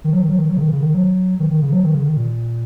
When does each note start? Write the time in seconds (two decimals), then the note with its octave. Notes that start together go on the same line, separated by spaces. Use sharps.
0.04 D#3
0.13 F#3
0.22 D#3
0.30 F#3
0.39 D#3
0.49 F#3
0.57 C#3
0.61 D#3
0.72 C#3
0.83 D#3
0.94 F#3
1.40 D#3
1.50 D#3
1.62 C#3
1.72 F#3
1.84 D#3
1.94 C#3
2.06 D#3
2.17 A#2